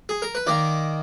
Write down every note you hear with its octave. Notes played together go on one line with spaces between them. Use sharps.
G#4
A#4
B4
D#3 A#3 D5